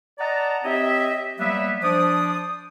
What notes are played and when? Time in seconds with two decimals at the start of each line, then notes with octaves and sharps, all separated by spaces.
0.19 D5 D#5 F#5 A5 A#5
0.63 C4 G4 C#5 D#5 E5
1.39 F#3 G3 A#3 B3 E5
1.82 F3 D4 C5 D5 D#6